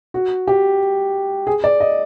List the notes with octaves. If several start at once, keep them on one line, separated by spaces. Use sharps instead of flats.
F#4
G4
G#4
D5
D#5